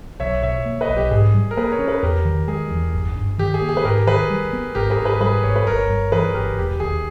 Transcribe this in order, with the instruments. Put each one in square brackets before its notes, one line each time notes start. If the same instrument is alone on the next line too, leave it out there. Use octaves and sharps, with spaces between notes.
[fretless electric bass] B1 [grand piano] C#5 E5
[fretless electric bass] B2 [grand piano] C#5 E5
[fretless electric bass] A#3
[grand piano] B4 D#5
[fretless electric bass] B1
[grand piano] G4
[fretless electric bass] G#2 [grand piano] G#4
[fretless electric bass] G3
[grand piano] A#4
[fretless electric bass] A#3 [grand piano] G#4 B4
[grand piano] A#4 C#5
[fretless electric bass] C#4
[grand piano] G#4 B4
[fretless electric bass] E2 [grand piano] G4 A#4
[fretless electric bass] D#3
[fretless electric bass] G#3 [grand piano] G#4
[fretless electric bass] E2
G1
G2
[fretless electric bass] D#3 [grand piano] G4
[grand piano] G#4
[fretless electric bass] A#3
[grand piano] G#4
B4
[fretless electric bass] G#2 [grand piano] G4 A#4
[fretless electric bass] D#3 [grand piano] G#4 B4
[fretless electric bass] G3
B3
[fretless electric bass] G#1 [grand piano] G4 A#4
[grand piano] G#4 B4
[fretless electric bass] G#2
[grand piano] G#4 B4
[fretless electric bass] G3 [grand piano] G#4 B4
[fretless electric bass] G#1 [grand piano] C#5
[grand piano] B4
[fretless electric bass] G1 [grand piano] A#4 C#5
[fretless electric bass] G2
[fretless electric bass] E3 [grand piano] G#4 B4
[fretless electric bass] G1 [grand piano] G4 A#4
[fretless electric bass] E1 [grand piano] G4
[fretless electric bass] D#2 [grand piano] G#4